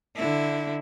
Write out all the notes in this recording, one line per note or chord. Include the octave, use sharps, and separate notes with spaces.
D3 E4